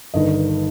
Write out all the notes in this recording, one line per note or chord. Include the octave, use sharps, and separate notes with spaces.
G1 G2 D#3 D#5